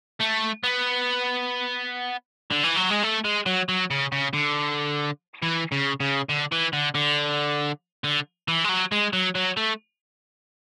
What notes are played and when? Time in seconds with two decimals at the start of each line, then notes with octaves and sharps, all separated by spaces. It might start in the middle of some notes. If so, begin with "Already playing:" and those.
0.21 A3
0.64 B3
2.52 D3
2.64 E3
2.77 F#3
2.91 G#3
3.04 A3
3.25 G#3
3.46 F#3
3.69 F#3
3.91 C#3
4.12 C#3
4.34 D3
5.43 E3
5.72 C#3
6.00 C#3
6.29 D3
6.52 E3
6.73 D3
6.95 D3
8.04 D3
8.48 E3
8.65 G#3
8.69 F#3
8.92 G#3
9.13 F#3
9.35 F#3
9.57 A3